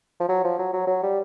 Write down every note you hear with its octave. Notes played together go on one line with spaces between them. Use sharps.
F3
F#3
F3
F#3
F#3
F#3
G3